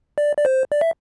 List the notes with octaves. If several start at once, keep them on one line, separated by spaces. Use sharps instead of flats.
D5
D5
C5
D5
E5